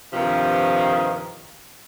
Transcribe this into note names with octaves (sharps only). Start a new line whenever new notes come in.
G2 C3 D#3 F3